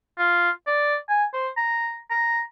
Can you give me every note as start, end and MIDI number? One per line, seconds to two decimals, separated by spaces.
0.18 0.50 65
0.67 0.96 74
1.09 1.25 80
1.33 1.48 72
1.57 1.96 82
2.10 2.41 82